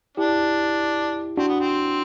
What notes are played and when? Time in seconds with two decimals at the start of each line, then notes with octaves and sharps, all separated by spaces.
0.17 D4 E4 G4
1.37 C4 D4 F#4
1.48 B3
1.60 C4